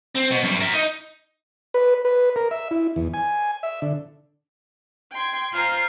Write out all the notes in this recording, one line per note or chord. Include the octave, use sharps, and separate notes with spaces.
C4
B2
F#2 G3
A#4 E5
D#4
B4
B4
A#4
E5
E4
E2
G#5
E5
D3
G5 C6 G#6
F4 C5 F5 G#5 A#5